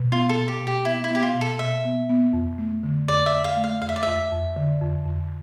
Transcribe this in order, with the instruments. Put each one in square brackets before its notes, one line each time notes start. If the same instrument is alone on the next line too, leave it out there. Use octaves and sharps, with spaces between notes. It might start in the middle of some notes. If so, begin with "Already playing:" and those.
Already playing: [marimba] B2
[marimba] B3 [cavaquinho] F4
[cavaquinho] A4
[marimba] B2
[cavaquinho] G4
[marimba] B2
[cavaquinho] G4
[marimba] B3 [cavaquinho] E4
[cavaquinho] E4
[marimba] B3 [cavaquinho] G4
[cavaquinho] F4
[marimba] B2
[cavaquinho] A4
[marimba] B2 [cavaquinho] E5
[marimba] B3
B3
F2
A3
D3
[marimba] F2 [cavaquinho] D5
[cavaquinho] E5
[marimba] F2
[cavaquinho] F5
[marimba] A3
[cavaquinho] F5
[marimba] F2 [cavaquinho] F5
[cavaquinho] E5
D5
[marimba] F2 [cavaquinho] E5
[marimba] F2
D3
F2
F2